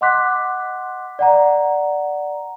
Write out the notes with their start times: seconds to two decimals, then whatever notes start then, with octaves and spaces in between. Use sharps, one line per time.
0.01 D#5 F#5 C6 D6 F#6 B6
1.19 D5 F#5 A#5